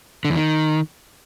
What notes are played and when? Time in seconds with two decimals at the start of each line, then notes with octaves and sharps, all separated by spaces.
0.25 D3
0.30 E2
0.36 D#3